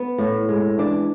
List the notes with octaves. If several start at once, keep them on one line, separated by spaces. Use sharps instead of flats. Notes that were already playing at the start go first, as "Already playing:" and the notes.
Already playing: B3
A2
G#3
E3 D4